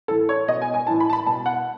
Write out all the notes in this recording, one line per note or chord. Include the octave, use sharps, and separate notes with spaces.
A2 E3 A4
C#5
B2 D#5
G#5
G#5
A2 E3 A5
B5
A5
B5
B2 A5
F#5